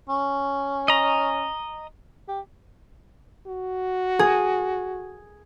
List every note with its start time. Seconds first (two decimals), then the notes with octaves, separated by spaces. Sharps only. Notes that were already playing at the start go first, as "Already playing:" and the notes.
0.09 C#4
0.88 D#5 A#5
2.28 G4
3.47 F#4
4.19 G#4